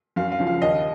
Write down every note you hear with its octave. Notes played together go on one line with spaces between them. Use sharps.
F#2 F5
F5
C#3 F3
F5
D#2 D#5